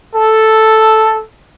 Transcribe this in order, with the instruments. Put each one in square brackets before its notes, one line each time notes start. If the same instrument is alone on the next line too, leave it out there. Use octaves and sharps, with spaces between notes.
[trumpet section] A4